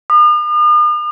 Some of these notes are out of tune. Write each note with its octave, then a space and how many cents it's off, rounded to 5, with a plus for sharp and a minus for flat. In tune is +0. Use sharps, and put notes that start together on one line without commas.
D#6 -45